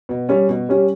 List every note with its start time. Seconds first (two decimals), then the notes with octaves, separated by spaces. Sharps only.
0.09 B2
0.29 G3 C#4
0.49 B2
0.69 G3 C#4 G4